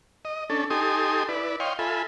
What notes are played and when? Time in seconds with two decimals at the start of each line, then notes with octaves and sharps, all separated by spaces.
0.25 D#5
0.50 C#4 D4 A4
0.70 D#4 G4 A4 G#5 C6 D#6
1.29 E4 B4 D5
1.60 C#5 D#5 F5 G5 C6
1.79 F4 A4 E5 G#5 B5